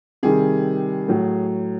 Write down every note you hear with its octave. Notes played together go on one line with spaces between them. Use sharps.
C3 D#3 G3 G#4
A2 F#3